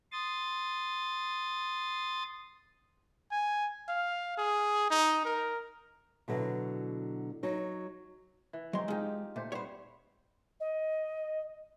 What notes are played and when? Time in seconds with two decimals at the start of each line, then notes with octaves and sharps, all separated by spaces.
0.12 C6 D#6 A6
3.31 G#5
3.88 F5
4.38 G#4
4.91 D#4
5.25 A#4
6.28 B2 D3 F#3 E4
7.43 F#3 D#4
8.53 E3
8.73 F#3 G#3 C4 D#4 C6
8.88 G#3 D#4 F4 G4
9.36 A#2 A3 C5
9.52 G3 B3 C5 C#5
10.60 D#5